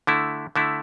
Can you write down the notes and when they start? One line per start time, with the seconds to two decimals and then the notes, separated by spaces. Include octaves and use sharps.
0.07 D3 A3 E4
0.56 D3 A3 E4